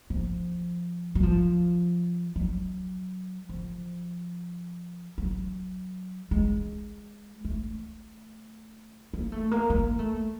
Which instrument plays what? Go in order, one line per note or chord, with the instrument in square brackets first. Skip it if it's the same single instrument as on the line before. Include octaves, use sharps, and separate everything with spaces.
[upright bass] F3
F#3
F3
F#3
F3
F#3
G#3
A3
A#3
A3
A#3
A#3
A3